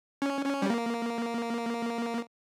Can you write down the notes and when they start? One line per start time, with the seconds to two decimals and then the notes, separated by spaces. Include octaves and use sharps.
0.22 C#4
0.46 C#4
0.62 G3
0.70 A#3